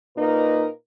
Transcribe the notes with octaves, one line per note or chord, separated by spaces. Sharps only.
A#2 A#3 D#4 A#4 B4 D#5